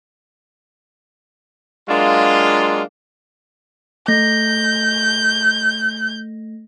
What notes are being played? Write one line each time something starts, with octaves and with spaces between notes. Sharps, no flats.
F#3 G#3 A#3 D4 F4
A3 G6 A#6